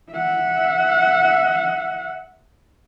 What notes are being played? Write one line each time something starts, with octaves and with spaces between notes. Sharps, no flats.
E5 F#5